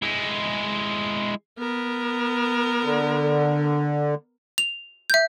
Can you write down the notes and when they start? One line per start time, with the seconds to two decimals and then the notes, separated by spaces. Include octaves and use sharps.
0.02 G#3 E4
1.59 B3 A#4
2.83 D3
4.58 F7
5.10 E5 G6